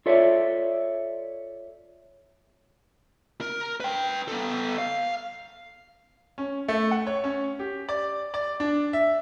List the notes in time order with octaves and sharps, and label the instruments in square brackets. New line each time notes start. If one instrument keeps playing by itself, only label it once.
[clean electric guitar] F4 A4 C#5 D5 E5
[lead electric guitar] A#4
B4 G5
B3 A4
F5
[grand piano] C#4
A3
F#5
C#5
C#4
G4
D5
D5
D4
E5